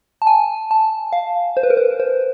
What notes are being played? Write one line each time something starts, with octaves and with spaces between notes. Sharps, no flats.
A5
G#5
A5
F5
C5
B4
A#4
B4
C5